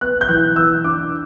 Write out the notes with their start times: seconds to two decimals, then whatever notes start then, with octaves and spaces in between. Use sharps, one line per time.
0.01 B3 F#6
0.21 G6
0.29 E3 F#6
0.56 E3 E6
0.84 D4 D6